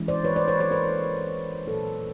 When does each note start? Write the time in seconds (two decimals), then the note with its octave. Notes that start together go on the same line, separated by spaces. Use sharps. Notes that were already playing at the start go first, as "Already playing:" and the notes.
Already playing: E3 G#3 C#4 E4
0.08 C5 D5
0.24 B4 C#5
0.36 C5 D5
0.48 B4 C#5
0.60 B4 C#5
0.71 A#4 C5
1.67 A#2 F#3 A#3 A4 B4